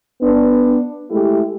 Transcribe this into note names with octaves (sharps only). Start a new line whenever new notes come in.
B3 D4
G#3 A3 E4 G4